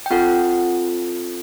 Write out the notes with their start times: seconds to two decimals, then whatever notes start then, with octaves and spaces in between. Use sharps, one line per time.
0.06 G5
0.10 C4 F4 A4 F#5